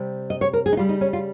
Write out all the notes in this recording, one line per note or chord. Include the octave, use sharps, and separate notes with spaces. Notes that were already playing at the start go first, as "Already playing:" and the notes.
Already playing: C3 G3
D#5
C#5
A#4
G#4
D#4
C#3 G3 F4
D#4
C#4
F4